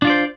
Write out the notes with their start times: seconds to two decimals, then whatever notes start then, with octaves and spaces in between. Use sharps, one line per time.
0.02 D4
0.05 F4
0.07 D5
0.10 C5